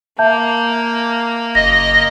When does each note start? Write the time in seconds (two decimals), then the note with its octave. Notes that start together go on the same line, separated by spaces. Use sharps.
0.19 A#3 E5 A5 G6
1.55 F#1 D#5 A#6